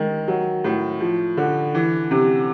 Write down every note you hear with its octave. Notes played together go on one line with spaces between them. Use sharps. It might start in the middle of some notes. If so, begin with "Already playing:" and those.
Already playing: D#3 G#3
F#3
A2
F3
D3
E3
C3